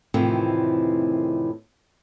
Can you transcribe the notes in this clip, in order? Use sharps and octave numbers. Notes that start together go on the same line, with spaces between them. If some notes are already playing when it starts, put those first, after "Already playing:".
F2 A2 C3 D#3 E3